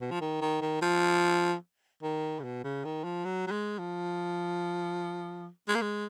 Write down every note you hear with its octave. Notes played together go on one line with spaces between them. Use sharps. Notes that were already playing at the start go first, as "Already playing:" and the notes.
B2
F3
D#3
D#3
D#3
F3
D#3
C#3
B2
C#3
D#3
F3
F#3
F#3
G#3
F3
G#3
A#3
G#3